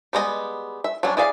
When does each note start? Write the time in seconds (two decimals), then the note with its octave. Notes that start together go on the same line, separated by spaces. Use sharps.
0.13 G3 G#3 B3 F#4 D#5
0.84 E5
1.03 F#3 G3 C#4 D4
1.17 E4 G#4 D5 F5